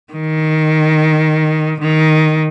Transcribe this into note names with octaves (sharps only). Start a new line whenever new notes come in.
D#3
D#3